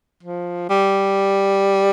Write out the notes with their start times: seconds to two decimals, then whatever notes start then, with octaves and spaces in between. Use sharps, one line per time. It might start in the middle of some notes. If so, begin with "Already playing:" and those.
0.23 F3
0.69 G3